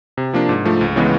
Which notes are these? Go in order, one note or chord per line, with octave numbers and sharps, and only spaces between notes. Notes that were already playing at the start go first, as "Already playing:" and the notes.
C3
F3 A#3 D4
G#2
F3 A3
C#2
C#3 E3 G#3 B3